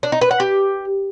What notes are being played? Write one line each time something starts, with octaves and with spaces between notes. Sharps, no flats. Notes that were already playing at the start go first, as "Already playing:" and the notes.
D4
D#4
B4
F#5
G4